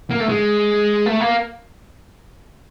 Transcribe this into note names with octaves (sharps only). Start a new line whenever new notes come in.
A#3
A3
G#3
A3
A#3